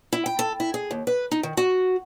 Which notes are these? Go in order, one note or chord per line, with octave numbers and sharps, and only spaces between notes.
E4
G5
A4
E4
G#4
D#2
B4
D#4
D#3
F#4